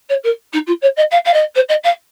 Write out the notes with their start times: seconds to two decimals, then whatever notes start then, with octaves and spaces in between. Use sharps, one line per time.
0.09 C#5
0.23 A#4
0.52 D#4
0.66 F4
0.81 C#5
0.96 D#5
1.11 F5
1.24 F5
1.33 D#5
1.55 C5
1.68 D#5
1.83 F5